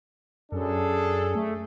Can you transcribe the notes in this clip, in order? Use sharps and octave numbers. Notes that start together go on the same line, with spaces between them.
F#2 D4 G#4 A4
A3